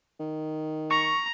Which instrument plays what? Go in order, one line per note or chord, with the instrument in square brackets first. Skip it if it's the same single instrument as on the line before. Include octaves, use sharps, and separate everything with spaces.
[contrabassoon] D#3
[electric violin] A#5 [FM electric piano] C#6